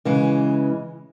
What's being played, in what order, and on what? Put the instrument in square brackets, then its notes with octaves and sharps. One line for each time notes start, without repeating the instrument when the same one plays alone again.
[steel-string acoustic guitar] C#3 E3 G#3